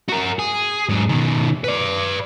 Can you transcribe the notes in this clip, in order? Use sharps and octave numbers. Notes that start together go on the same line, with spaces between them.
F#4 A#4
G#4
G#2 F#3
B2 D#3
B4 D5